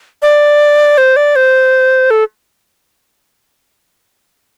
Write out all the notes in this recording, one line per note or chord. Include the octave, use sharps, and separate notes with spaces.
D5
C5
D5
C5
A4